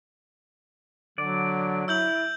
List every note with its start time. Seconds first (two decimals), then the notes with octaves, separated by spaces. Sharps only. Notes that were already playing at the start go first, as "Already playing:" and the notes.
1.18 D3 F#3 D5
1.88 E4 E6 G6 F#7